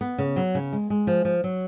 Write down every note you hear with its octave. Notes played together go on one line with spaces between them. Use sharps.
B3
C#3
F#3
C#3
G#3
G#3
F3
F3
F#3